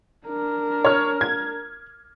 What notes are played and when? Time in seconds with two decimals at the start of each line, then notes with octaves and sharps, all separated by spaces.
0.26 D4 A#4
0.84 C#5 F6
1.21 G#6